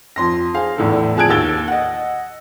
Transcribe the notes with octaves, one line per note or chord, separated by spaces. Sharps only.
F2 C6 A#6
G#4 C5 F5
E2 A2 D3 A4
F2 G#4 A5 F#6 G#6 D7
D#2 E6 A6 G7
D#5 F#5